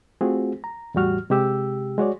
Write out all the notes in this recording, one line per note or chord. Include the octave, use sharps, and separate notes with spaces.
A3 C4 F4 F#4 G#4
A#5
E2 A2 G3 F#4 F6
C3 G#3 G4 E6
G#3 F#4 C#5 D5